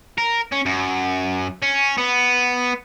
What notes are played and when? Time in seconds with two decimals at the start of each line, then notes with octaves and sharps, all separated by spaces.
0.18 A#4
0.52 C#4
0.66 F#2
1.62 C#4
1.98 B3